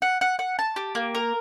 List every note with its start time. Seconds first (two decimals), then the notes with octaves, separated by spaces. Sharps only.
0.02 F#5
0.21 F#5
0.39 F#5
0.59 A5
0.76 G4
0.95 A#3
1.15 A#4